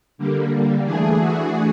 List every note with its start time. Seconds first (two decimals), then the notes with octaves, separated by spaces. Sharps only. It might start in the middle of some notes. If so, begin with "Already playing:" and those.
0.18 D3 G3 A#3
0.84 E3 A3 D4 G#4
1.17 F#4